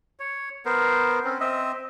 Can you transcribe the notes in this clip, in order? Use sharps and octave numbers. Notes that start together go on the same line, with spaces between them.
C#5
B3 A#4 C5
C4 C#4
C4 D#5 E5